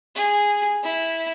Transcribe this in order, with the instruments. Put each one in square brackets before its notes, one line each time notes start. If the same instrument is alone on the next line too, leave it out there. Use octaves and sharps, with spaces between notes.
[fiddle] G#4
E4